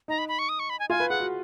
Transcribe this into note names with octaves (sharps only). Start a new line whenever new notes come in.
D#4 A#5
B5
B5
C#6
D#6
C#6
B5
G#5
F4 G#5
B4
G#4 F#5
F#4